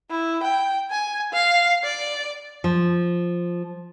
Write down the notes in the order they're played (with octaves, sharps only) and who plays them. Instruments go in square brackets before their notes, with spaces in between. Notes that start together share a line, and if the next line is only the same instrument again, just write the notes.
[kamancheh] E4
G5
G#5
F5
D5
[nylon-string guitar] F3